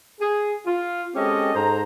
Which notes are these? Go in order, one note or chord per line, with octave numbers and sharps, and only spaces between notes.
G#4
F4
G#3 C4 C#4 G4 A4 D#5
G#2 A4 C5 A#5